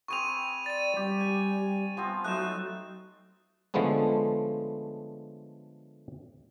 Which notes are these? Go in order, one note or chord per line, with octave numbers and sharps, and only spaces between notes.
C4 G#4 B4 C#6 D#7 F7
D5 A6 D#7
G3 G4
G#5
F3 B3 C4
F#3 A3 D#4 C5 F#6 E7
D3 F3 G#3 A3 B3 C#4